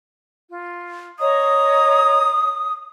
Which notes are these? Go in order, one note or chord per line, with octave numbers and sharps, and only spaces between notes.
F4
C#5 D#5 A#5 D#6